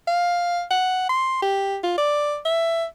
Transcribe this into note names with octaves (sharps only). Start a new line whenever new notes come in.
F5
F#5
C6
G4
F4
D5
E5